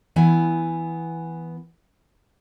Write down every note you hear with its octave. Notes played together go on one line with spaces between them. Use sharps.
E3 B3 E4 G#5